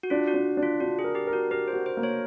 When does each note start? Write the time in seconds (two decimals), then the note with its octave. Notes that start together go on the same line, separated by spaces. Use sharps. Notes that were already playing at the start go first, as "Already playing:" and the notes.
0.03 F#4
0.10 D4 F4
0.28 F#4
0.34 D4
0.57 D4
0.63 F4
0.80 D4 F#4
0.99 G#4
1.04 A#4
1.15 G4
1.27 A#4
1.33 F#4
1.51 G4 A#4
1.68 C5
1.73 F#4
1.86 C5
1.97 A#3
2.03 C#5